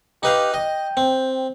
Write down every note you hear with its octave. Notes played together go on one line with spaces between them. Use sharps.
D#4 G4 B4 F5
D#5 G5
C4